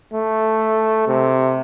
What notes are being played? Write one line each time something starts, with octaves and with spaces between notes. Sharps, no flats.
A3
C3